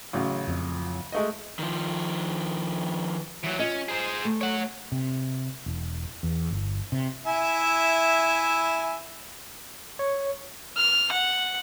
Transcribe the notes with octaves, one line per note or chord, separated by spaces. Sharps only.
A1 C#3 F#3
F2
G#3 A3 D#5
D#3 F3
E3 F#3
C#4 F4 D#5
G#4 C5
A3
C#5 F#5
C3
E1
E2
G1
C3
E4 E5 G#5
C#5
F6
F#5